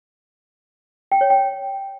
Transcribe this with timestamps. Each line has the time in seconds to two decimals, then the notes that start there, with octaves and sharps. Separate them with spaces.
1.12 G5
1.21 C#5
1.30 G5